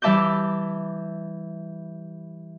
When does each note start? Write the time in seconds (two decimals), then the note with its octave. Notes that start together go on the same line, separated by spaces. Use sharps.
0.02 E3 G3 E5 A5 D6 G6